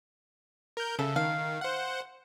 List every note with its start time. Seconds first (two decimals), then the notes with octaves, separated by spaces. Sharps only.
0.77 A#4 G6
0.99 C#3 A4 E5
1.16 D#3 F5
1.61 C5 F#5